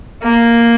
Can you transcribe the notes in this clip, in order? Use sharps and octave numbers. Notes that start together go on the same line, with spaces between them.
A#3